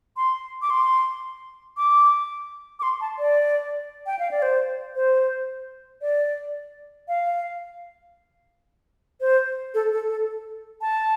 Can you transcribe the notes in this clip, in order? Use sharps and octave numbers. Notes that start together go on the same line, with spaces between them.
C6
D6
C6
D6
D6
C6
A5
D5
G5
F5
D5
C5
C5
D5
F5
C5
A4
A4
A4
A5